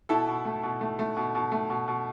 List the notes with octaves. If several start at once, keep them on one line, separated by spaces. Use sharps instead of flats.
B2 E4 A4
B2
A3
B2
A3
A3
B2
B2
A3
B2
B2